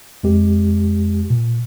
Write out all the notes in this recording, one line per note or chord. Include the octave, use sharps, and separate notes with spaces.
F2 G#3 G4
A#2